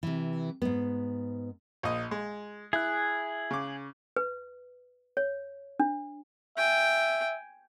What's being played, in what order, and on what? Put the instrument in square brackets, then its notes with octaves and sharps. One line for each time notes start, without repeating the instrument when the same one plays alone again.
[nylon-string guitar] C3 E3
G#2 B3
[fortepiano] A#1 D#5
G#3
[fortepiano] E4 [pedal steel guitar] G#4 F#6
[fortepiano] C#3 D6
[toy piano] B4
C#5
D4
[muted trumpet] E5 [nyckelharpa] G5 G#5